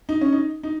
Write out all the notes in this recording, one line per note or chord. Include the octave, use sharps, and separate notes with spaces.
D#4
C#4
D#4
D#4